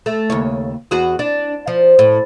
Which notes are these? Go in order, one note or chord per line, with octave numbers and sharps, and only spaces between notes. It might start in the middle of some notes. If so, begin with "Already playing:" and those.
A3
D#2 C#3 C#5
E2 F#4 G#4
D4
F3
A2